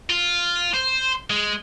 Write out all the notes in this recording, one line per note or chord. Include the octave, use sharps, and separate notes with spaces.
F4
C5
G#3